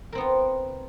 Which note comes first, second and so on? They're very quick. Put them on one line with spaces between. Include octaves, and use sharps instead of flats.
A#4 C4 B3 F4